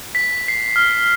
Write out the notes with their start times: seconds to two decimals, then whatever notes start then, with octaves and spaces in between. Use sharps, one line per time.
0.15 B6
0.48 C7
0.76 F6